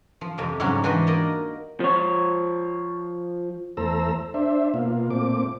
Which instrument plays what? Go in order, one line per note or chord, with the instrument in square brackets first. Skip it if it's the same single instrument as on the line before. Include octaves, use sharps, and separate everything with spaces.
[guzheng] F3
F2 C3 G4
G#2 C#3 F#3 G3 C#4 F#4
E3 D4 F#4 B4 C5 D#5
A#3 D#4 D5 D#5
[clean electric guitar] F3 C#5
[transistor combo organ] E2 A3 A4 C5 A#5 E6
D4 C5 E5
B2 A#3 F4
A#2 A3 C4 D6